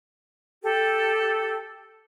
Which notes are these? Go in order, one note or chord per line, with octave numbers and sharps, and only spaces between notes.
G4 A4